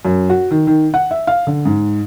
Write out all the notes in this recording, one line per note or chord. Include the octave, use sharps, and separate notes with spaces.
F#2
F#4
D#3
D#3
F#5
E5
F5
D3
G#2